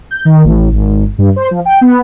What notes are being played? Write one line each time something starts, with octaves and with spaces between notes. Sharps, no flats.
G6
D#3
A1
G#1
G2
C5
F3
G5
B3